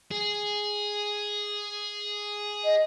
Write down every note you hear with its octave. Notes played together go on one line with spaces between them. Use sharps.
G#4
D#5